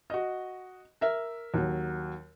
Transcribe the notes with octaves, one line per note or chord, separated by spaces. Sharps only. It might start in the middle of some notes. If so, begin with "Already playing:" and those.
F#4 D#5
A#4 E5
D#2 F#3